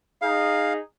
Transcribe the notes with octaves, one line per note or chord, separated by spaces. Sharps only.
D#4 G#4 F5